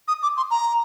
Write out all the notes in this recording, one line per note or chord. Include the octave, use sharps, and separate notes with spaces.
D#6
D6
C6
A#5